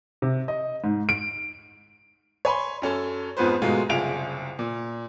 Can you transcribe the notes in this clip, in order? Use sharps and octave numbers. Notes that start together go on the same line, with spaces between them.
C3
D#5
G#2
D7
C#5 G#5 B5 C6
F#2 C#4 A4 A5
F2 G#2 F3 B3 B4 C5
G#2 B2 F#3 G#3 A3 F4
F#1 C2 F4 G#4 D7 F7
A#2